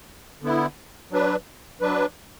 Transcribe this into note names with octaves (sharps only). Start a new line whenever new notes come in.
D3 B3 E4
F#3 D4 B4
F#3 D4 B4